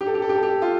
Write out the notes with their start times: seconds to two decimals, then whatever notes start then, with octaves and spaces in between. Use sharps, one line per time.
0.01 G4
0.07 A4
0.14 G4
0.22 A4
0.29 G4
0.36 A4
0.43 G4
0.62 F4